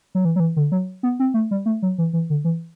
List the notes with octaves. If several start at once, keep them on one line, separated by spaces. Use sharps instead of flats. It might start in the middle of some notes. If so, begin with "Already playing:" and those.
F#3
E3
F#3
E3
D3
F#3
B3
C4
A3
G3
A3
F#3
E3
E3
D3
E3